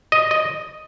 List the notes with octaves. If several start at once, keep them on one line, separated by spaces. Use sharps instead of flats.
D#5
D#5